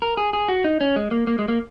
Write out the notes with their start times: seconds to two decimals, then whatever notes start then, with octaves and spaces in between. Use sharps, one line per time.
0.02 A#4
0.17 G#4
0.33 G#4
0.48 F#4
0.64 D#4
0.81 C#4
0.96 G#3
1.11 A#3
1.27 A#3
1.39 G#3
1.48 A#3